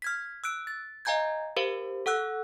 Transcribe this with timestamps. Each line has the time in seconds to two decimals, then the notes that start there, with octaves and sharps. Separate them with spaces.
0.02 F6 G#6 B6
0.44 E6 F#6 D7
0.67 A6
1.05 D#5 F5 G#5 A#5 G6 G#6
1.56 G4 A#4 C5 F5
2.06 A4 F#5 E6 F#6